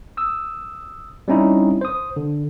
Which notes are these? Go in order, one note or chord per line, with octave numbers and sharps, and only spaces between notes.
D#6 E6
G3 C4 C#4 D#4 E4
C5 D#6
D3